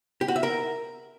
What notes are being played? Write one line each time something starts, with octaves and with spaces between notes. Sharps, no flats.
G4
F#4
E5
A#4